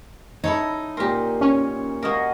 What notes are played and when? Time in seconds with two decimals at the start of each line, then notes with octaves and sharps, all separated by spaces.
0.44 D#4 E4 A4 C#5
0.97 A#2 G4 A#4 C6
1.41 C#4 C#5
2.02 A#3 F#4 A#4 D#5 F5